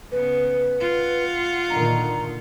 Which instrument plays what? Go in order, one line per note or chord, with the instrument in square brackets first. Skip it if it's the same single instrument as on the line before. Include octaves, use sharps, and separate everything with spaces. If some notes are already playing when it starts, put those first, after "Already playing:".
[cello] C#3 B3 [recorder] B4
[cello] F4 F#5
[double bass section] A#2 D3 D#3 [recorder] A#5